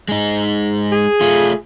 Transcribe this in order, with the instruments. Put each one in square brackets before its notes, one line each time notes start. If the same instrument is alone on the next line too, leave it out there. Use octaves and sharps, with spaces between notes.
[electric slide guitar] G#3 D#4
[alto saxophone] G#4
[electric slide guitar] A3 F4